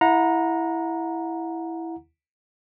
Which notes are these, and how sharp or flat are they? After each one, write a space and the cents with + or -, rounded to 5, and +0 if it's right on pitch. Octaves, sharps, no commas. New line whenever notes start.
E4 +0 F#5 -30 A#5 +0